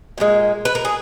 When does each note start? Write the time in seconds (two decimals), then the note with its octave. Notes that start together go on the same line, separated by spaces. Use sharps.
0.18 A#2 F3 G#3
0.65 B4
0.75 A#4
0.85 G#4